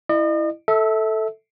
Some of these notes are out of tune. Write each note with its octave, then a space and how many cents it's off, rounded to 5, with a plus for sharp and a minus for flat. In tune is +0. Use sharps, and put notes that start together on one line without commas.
E4 +0 D#5 -40
A4 +0 E5 -25